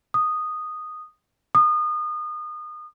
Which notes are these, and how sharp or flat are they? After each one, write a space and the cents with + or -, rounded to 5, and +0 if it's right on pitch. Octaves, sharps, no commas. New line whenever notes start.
D#6 -10
D#6 -30